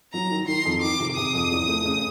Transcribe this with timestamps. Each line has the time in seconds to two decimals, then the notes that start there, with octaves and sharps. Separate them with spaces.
0.13 F#3 A#5
0.30 D#3
0.47 D#3 C6
0.65 F2
0.81 D#3 D6
0.99 C3
1.16 C3 D#6
1.34 F2
1.51 E2
1.68 A3
1.85 C#3